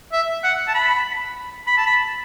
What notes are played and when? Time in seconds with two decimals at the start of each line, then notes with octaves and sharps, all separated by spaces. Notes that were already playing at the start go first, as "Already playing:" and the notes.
0.12 E5
0.44 F#5
0.68 A5
0.74 B5
1.67 B5
1.77 A5
1.86 B5